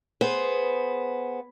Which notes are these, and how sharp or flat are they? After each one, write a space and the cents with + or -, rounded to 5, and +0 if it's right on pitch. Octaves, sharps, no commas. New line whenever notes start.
B3 +0 G#4 +0 C5 +0